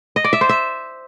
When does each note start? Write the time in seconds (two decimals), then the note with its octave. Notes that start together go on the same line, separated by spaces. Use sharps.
0.16 D#5
0.24 D5
0.33 E5
0.41 C5
0.49 E5